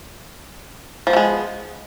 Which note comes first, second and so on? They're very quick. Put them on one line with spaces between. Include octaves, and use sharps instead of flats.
F3 B3 A3 G#3